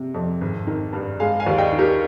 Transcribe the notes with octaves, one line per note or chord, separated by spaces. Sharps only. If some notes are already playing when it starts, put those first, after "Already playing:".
Already playing: C3
F2
G#1
D#3
G2
G#3 F5 G#5
F5 G#5
D#2
D#5 G5
D#3
G4 A#4